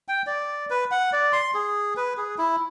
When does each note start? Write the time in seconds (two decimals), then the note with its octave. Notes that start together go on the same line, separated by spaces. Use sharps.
0.08 G5
0.27 D5
0.70 B4
0.91 F#5
1.13 D5
1.33 C6
1.54 G#4
1.97 B4
2.17 G#4
2.38 E4